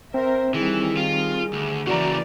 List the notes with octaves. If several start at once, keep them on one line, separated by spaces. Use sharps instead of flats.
C4 A#4 C5 E5
D#3 E3 G3 G#4
F4
D2
C#3 E3 A#3 F#4 D5 A#5